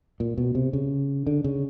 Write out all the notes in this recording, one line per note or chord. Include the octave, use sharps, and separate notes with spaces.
A#2
B2
C3
C#3
D3
C#3